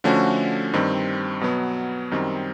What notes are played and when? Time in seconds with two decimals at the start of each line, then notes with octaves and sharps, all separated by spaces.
0.04 D3 F3 A3 C#4 F#4
0.73 G2 D#3 G3 C4
1.41 B2 F#3 B3
2.11 F#2 D#3 G3 C4